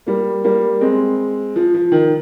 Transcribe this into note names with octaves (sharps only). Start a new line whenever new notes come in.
G3 A#3
G3 A#3
G#3 C4
F3
F3
D#3